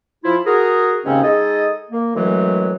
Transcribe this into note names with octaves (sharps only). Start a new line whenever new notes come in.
F3 E4 F4
F#4 G#4 A#4
D#2 G#2 C#3 C4 C#4
G#3 D#4 G#4 A4 D#5
A#3
F#2 A2 E3 F#3 G#3 A3